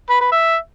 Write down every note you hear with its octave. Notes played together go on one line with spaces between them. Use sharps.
B4
B4
E5